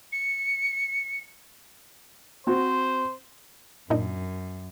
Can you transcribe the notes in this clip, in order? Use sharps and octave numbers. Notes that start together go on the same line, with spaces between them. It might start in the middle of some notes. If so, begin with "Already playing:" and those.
C#7
C4 F#4 C5
F#2 A#2 D4 D#4